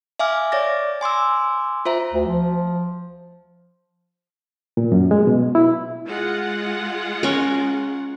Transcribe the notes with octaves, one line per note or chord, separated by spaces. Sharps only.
E5 F5 G#5 D6 F6
C#5 D5 D6 A6 A#6
G#5 C6 D6 E6
F4 C5 E5 A#5
D2
F3
A#2
F#2
G#3
B2
E4
G#3 F4 F#5
C#4 A#4